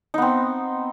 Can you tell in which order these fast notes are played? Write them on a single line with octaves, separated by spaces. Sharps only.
D#4 B3 C4